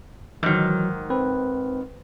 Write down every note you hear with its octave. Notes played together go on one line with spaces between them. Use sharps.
G#2 D#3 E3 F#3
C4 B4